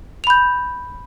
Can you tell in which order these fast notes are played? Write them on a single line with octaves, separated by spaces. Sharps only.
F7 B5 G6